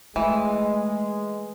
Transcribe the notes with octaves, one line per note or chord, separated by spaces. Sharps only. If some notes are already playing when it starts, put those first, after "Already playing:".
E3 G#3 A3